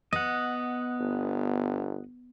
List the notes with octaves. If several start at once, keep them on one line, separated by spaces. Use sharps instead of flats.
B3 D#5 F#5
G1